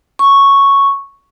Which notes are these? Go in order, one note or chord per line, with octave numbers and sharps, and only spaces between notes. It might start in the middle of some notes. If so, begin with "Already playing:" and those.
C#6